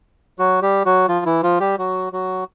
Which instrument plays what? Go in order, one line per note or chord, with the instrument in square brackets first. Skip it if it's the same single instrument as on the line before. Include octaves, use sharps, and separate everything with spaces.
[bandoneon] F#3 F#4
G3 G4
F#3 F#4
F3 F4
E3 E4
F3 F4
G3 G4
F#3 F#4
F#3 F#4